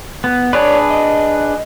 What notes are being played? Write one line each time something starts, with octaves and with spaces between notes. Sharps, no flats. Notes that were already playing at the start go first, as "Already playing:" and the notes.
B3
D4 G#4 B4 C#5 D5
D#5